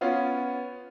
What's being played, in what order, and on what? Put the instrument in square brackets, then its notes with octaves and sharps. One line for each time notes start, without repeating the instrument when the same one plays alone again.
[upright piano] B3 C#4 F4